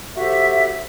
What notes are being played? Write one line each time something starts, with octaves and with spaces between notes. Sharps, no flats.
F#4 G4 A4 C5 E5